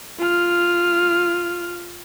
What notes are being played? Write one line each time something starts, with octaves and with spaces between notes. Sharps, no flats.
F4 F6